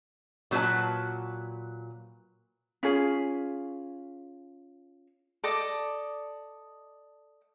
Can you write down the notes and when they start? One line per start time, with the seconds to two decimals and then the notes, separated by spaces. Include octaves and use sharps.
0.51 A#2 F#3 A#3 B4 A5
2.83 C#4 F4 G#4
5.44 A4 D5 D#5 D6